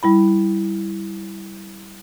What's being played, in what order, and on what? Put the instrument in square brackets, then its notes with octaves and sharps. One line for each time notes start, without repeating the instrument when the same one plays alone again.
[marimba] G3 E4 B5